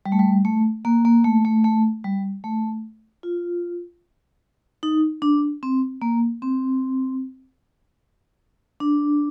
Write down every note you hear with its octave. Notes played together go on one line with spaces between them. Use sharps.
G3
A3
G3
A3
A#3
A#3
A3
A3
A3
G3
A3
F4
D#4
D4
C4
A#3
C4
D4